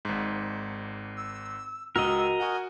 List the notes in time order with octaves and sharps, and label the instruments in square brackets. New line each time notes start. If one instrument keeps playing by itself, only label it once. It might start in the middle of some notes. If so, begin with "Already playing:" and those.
[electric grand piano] G#1 G#2
[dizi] E6
[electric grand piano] C#2 [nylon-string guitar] F#4 [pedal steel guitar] A#4 D#5 [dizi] E6
[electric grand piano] F#4 F#5 [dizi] G#5